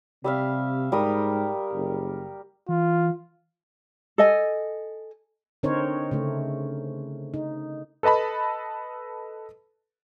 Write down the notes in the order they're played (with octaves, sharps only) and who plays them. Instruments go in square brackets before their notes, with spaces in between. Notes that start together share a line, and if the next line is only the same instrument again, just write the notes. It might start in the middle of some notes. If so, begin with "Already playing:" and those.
[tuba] C3 [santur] G3 E5 F5
[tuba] G#2 [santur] G3 A#4 D#6
[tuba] F#1
[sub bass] E3 [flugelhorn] F4
[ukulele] A4 D#5 G#5
[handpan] D3 C4 D#4 A#4 C5 C#5
C#3 A3
D#4
[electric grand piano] A4 B4 D#5 A5 B5